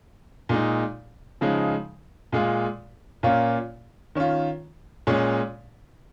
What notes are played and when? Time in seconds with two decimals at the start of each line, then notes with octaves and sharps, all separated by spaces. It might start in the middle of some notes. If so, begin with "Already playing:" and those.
0.49 A#2 G#3 D#4
1.41 C#3 F3 G#3 D#4
2.32 A#2 G#3 F4
3.23 A#2 A#3 C#4 F4
4.15 D#3 C#4 F4
5.07 A#2 G#3 C#4